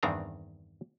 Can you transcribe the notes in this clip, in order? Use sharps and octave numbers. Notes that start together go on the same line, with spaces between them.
E2 G2 D#3 C4 D4 A#5